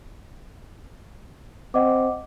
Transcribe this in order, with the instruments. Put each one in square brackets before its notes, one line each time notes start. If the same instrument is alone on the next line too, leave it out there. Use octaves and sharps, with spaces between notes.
[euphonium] C4 [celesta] D#5 F#5 D6